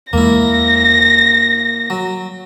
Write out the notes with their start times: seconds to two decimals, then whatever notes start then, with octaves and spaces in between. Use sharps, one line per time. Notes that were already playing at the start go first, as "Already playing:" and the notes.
0.13 E2 G#3 A#3 E4 A#6
1.90 F#3